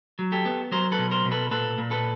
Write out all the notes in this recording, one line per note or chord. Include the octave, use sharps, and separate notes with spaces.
F#3
G4 A4
B3
F#3 A#4 C5
A4 B4
B2
A#4 C5
B2
A4 B4
A#2 A4 B4
A#2
A4 B4